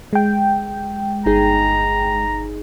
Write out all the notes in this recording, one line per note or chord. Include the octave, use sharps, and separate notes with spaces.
G#3 G5
G1 D#4 G#4 A#5